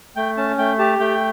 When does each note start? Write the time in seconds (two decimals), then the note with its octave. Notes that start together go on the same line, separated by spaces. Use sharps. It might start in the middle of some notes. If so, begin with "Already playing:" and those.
0.16 A3 G5
0.37 C#4 A5
0.58 A3 G5
0.79 G4 A5
1.00 A3 G5